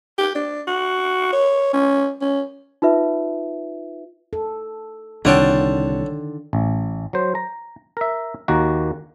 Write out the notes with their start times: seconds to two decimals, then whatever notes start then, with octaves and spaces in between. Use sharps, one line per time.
0.18 G4
0.35 D4
0.68 F#4
1.33 C#5
1.74 C#4
2.21 C#4
2.82 D#4 F4 B4 E5
4.33 A4
5.25 C2 D3 D#3 F4 A4 C#5 F#5 G5
6.53 A1
7.13 F#3 C5
7.35 A#5
7.97 A#4 E5
8.48 D#2 D#3 A#3 F#4